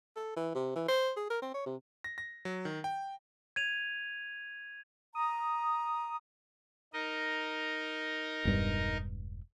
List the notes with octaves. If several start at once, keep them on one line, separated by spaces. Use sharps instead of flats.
A4
E3
C3
E3
C5
G#4
A#4
C4
C#5
C3
A#6
A#6
F#3
D#3
G5
G#6 D#7 F7
A#5 D#6
D#4 A#4 D#5
E1 G2